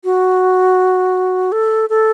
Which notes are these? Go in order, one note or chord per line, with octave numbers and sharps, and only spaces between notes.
F#4
A4
A4